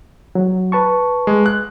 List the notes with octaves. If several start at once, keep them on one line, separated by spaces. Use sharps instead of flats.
F#3
B4 A5 C#6
G#3
F#6